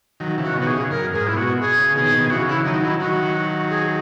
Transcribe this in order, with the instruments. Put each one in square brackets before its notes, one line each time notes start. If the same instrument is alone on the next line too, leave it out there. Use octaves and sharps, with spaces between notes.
[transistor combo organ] D#3 F#3
C#3 E3
[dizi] F#4
[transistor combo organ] B2 D#3
[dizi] F#4
G#4
[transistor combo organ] C#3
[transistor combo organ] F#2 [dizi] A#4
[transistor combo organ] G#2 [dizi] G#4
[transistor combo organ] A#2 [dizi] E4
[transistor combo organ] B2 [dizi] F#4
[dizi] G#4
[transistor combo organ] C#3
[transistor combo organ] B2 D#3 [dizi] G#4
[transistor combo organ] B2 D#3
[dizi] G#4
[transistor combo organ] C#3 E3 [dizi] F#4
[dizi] E4
[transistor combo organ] D#3 F#3 [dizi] D#4
[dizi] E4
[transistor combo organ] D#3 F#3 [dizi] F#4
[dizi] G#4